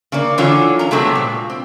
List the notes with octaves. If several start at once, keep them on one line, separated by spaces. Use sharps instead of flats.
C#3 A#3 D5
D3 E3 F#3 C#4 F4
C#4 A#5
C3 F#3 G#3 A3 B3 C4
A#2
C4